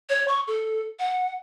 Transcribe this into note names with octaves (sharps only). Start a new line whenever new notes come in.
C#5
C#6
A4
F#5